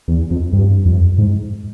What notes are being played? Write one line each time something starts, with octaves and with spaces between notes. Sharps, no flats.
E2
F2
G2
F2
G#2